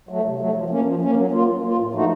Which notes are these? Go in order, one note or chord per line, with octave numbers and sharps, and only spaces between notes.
F#3 A3
C3
F#3 A3
F3
A#3 C#4
F3
A#3 C#4
F#3
A#3 F4
F#3
A#3 F4
A2
F3 A3 D#4 F#4